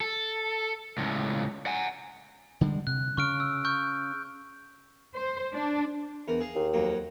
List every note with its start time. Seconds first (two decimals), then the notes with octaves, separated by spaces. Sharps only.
0.01 A4
0.98 C#2 A2
1.66 F#5 G#5
2.61 D3 G3 G#3
2.87 C3 F#6
3.17 C#3 C#6 F6 D7
3.40 E6
3.65 C#6 F6 G6
5.14 C5
5.54 D4
6.28 E2 A#4
6.40 G#4 F5
6.55 D#2
6.73 F2 F#3 A#3